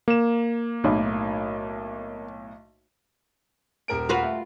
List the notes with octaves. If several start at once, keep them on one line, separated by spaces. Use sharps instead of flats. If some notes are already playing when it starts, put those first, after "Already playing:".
A#3 E7
B1 A2
D#1 A#4 D7
F4 F#4 B4
A3